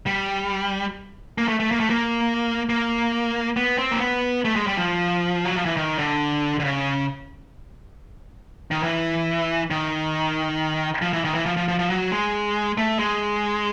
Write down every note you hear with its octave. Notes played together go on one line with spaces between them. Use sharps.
G3
A#3
A3
A3
A#3
A3
A#3
A#3
B3
C4
A#3
B3
A3
G#3
G3
F3
F#3
F3
E3
D#3
D3
D3
C#3
D#3
E3
D#3
F3
E3
D#3
E3
F3
F3
F3
F3
F#3
G#3
A3
G#3